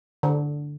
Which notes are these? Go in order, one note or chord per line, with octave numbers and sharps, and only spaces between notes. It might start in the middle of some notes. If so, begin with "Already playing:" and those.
D3